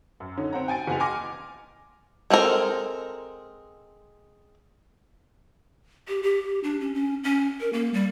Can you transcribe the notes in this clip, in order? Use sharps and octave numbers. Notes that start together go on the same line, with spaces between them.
F#2
D3 C#4 D#4
C4 F#5 A#5
G5 G#5 A6 D7
F#1 E2 F#5 G#5 F7
G5 G#5 C6 D6 F6 A#6
G#3 C4 A4 A#4
G4
G4
D4
C#4
C#4
C#4
A#4
A#3
G3